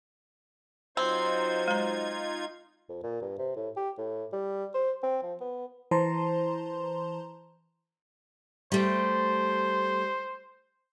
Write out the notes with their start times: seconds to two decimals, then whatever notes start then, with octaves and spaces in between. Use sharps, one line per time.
0.97 F#3 C4 D#4 F4 C5 G#6
1.68 G#3 A#5
2.89 F2
3.03 A#2
3.22 G2
3.39 C3
3.56 A2
3.77 G4
3.98 A2
4.33 G3
4.74 C5
5.03 C4
5.23 F3
5.40 B3
5.91 E3 C5 A5 A#5 C6
8.72 G3 A3 C5